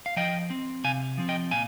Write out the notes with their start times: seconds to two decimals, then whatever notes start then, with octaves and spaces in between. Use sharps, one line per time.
0.06 F5
0.16 F3 D#5 G5
0.50 C4
0.84 C3 F5 G#5
1.18 F3 C4
1.29 D#5 G5
1.51 A#2 F5 G#5